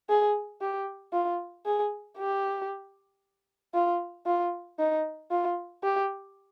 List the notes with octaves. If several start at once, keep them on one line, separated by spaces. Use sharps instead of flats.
G#4
G4
F4
G#4
G4
F4
F4
D#4
F4
G4